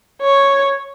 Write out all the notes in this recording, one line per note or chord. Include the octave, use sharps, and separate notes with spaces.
C#5